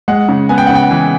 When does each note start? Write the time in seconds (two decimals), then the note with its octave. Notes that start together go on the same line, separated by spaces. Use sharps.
0.08 G#3 F#5
0.29 C#3
0.49 B3 G#5
0.58 G5
0.67 C#3 F#5
0.75 G5
0.91 E3